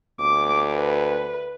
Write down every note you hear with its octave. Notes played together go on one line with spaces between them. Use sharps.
D2 D6
B4